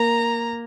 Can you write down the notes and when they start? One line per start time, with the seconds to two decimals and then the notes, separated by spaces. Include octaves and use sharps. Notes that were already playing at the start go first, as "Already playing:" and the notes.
Already playing: A#3 A#5